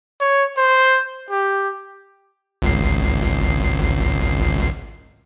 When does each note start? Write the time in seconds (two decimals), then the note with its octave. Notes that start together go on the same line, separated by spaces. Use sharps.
0.21 C#5
0.57 C5
1.30 G4
2.62 G#1 C#2 C7